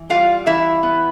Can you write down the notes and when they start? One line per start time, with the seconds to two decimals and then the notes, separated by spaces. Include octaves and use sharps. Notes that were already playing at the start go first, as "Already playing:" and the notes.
Already playing: E3
0.10 G3 F4 F5
0.46 E3 E4 E5
0.83 B3